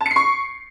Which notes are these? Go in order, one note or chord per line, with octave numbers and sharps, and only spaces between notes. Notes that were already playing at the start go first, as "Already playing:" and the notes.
A5
C#7
C7
C#6